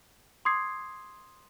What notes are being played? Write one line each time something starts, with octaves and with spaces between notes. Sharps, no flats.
C6 D6 D#6 G#6 C7